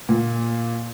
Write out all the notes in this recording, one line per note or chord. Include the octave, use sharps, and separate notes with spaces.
A#2